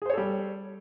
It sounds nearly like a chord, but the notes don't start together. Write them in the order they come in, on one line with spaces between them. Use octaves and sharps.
G#4 C5 C#5 A4 G3